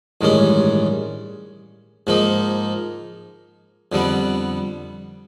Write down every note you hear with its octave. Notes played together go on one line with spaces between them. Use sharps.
A1 G2 D#3 G#3 C#4
G#2 F3 A#3 D#4
F2 D3 G3 B3